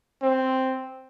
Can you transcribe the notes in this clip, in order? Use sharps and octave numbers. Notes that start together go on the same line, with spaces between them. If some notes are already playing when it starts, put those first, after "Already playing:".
C4